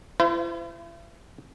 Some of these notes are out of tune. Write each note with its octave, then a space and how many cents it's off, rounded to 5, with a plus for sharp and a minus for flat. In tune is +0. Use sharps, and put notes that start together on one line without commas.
E4 +40 C5 -35